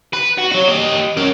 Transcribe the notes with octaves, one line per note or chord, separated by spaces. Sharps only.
B4
F#4
F#4 C#5
G4 D#5
C#4 A#4